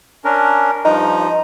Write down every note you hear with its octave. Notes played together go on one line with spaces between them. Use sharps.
C#4 D4 A#4
G2 F3 D#4